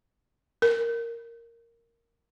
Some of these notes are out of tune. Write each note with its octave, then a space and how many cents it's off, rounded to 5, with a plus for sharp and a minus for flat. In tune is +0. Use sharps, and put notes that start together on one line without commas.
A#4 -5